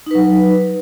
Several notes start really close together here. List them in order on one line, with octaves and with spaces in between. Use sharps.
D#4 B4 F#3